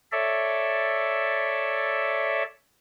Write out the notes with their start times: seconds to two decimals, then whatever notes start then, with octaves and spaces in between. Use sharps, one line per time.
0.12 A4 C#5 D5 E5